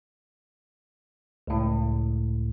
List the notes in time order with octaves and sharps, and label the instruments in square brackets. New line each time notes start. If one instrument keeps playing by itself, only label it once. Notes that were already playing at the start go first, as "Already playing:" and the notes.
[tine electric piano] C#2 A2